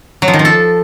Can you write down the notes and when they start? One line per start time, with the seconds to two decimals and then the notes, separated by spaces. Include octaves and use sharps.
0.22 F#3
0.28 F3
0.33 D#3
0.39 F3
0.45 A4